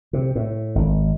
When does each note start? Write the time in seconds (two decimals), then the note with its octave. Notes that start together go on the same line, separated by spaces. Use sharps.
0.13 C3
0.35 A2
0.75 G#1